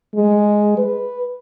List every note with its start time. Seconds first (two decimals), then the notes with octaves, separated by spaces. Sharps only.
0.15 G#3
0.78 B4